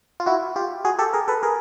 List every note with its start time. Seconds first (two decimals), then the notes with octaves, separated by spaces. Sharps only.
0.20 F4
0.26 E4 F#4
0.56 F4 G4
0.85 F#4 G#4
0.99 G4 A4
1.13 G#4 A#4
1.28 A4 B4
1.43 G#4 A#4